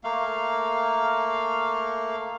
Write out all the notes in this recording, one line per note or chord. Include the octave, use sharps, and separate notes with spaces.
A3 A#3 F5